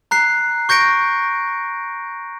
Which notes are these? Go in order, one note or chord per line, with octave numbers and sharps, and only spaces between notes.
A#5 F#6 C7
C#6 G6 A#6 C#7 D7